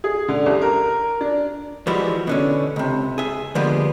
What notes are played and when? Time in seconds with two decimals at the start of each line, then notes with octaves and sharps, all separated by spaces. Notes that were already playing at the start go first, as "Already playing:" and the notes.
0.04 G#4
0.28 D3
0.46 C2
0.61 A#4
1.21 D4
1.87 E3 F3 G3 G#3 E4 F#4
2.27 B2 D3 C#4
2.76 C#2 C3
3.18 G#4 E5
3.55 D3 F3 G3 G#3 A#3 B3